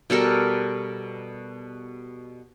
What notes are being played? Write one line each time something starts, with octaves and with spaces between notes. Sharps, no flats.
B2 G3 A4 A#4